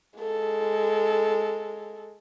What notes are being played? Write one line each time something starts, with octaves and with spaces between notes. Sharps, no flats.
G#3 A4